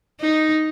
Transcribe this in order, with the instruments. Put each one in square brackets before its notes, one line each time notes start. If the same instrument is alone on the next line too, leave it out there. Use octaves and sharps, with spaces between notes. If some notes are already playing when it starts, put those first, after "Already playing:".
[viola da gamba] D#4